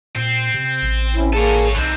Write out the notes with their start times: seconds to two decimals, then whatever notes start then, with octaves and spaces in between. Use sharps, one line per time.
0.16 A#2 C4
0.54 C3
0.82 A1
1.15 C4 C#4 E4
1.33 A#3 G#4 A4 C#5
1.75 B1 D3 C4 D#4